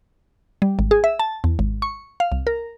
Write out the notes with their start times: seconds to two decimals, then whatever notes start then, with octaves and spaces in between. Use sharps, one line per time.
0.62 G3
0.79 G#1
0.91 G#4
1.04 E5
1.19 A5
1.44 E2
1.59 G#1
1.82 C#6
2.20 F5
2.32 C2
2.47 A#4